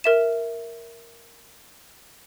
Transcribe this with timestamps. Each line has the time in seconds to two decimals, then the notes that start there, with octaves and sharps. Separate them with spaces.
0.04 A#4 E5 E7